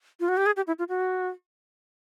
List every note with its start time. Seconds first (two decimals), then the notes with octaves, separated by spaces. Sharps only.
0.20 F4
0.28 F#4
0.37 G4
0.46 G#4
0.57 G4
0.67 E4
0.79 F4
0.89 F#4